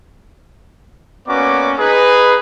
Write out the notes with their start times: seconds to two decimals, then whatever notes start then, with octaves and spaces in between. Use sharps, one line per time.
1.27 A#3 B3 C#4 F#4 D5 D6
1.77 D#4 G#4 B4